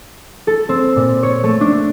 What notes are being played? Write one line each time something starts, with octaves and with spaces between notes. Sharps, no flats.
A4
C4
A#2
C#5
A3
D4